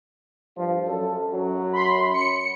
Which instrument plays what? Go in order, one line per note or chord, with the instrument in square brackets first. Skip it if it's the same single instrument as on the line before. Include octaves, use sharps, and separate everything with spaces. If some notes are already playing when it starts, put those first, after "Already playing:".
[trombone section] G2 F3 F4
F#2 A4
F#2 F#3
[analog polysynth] B5 C6
C#7